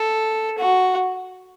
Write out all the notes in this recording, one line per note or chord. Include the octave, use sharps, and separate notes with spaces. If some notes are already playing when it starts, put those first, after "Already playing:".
Already playing: A4
F#4